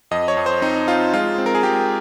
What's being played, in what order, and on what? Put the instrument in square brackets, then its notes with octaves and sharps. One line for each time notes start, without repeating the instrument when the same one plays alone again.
[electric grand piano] F2 D#5
C#5
F2
C5
C4 D#4
C4 F4
G#3 F4
C4
A#4
G#4
G#3 G4